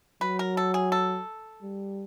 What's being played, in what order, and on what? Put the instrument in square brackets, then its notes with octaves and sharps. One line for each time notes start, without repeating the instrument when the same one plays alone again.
[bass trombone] F#3 [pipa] B4
[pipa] A#4
A4
G#4
A4
[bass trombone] G3